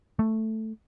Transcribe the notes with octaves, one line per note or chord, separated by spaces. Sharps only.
A3